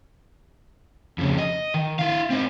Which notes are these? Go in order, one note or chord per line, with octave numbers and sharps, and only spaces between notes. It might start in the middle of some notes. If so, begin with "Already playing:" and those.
F2 C#3
D#5
D#3
E4 F5
C4 D#4